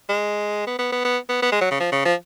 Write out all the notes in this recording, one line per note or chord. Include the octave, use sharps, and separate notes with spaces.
G#3
B3
B3
B3
B3
B3
B3
G#3
F#3
C#3
F3
C#3
F3